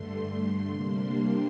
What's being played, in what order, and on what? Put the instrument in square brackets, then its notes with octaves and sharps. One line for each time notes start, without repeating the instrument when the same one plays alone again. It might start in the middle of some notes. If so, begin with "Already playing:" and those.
Already playing: [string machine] G2 D3 A3 C6
C6
C3 G3 A#3 D4